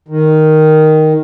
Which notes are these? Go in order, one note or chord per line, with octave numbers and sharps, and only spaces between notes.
D#3